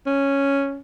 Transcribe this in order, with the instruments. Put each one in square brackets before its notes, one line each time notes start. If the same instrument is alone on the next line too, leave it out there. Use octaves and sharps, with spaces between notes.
[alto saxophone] C#4